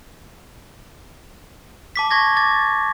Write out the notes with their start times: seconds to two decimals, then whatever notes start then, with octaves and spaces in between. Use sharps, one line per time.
1.96 A5 D6 B6
2.11 C#6 G#6 A#6
2.36 D6 A6